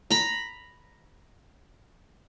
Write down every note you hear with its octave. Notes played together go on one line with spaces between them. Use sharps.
A#5 B5